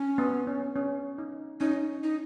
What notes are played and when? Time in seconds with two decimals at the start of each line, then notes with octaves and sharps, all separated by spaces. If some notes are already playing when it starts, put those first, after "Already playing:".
Already playing: C#4
0.18 B3
0.47 C#4
0.76 C#4
1.18 D#4
1.60 C#4 D#4
2.03 D#4